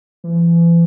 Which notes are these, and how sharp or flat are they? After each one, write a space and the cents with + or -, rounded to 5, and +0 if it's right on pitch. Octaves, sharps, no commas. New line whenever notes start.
E3 +40